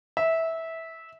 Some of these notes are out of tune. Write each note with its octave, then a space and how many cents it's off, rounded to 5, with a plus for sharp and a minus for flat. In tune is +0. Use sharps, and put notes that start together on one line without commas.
E5 -15